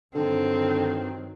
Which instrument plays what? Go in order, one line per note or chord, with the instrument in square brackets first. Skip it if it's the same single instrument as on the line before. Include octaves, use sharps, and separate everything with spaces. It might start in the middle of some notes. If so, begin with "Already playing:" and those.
[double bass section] G2 D#3 F#3 [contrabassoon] D3 [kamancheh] C4